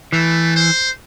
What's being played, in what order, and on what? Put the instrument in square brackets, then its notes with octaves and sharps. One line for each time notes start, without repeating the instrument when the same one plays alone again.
[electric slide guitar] E3 [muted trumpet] A3
[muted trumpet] C5